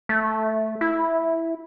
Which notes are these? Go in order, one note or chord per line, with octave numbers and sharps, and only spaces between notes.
A3
E4